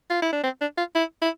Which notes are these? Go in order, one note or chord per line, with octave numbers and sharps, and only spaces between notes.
F4
E4
D4
C4
D4
F4
E4
E4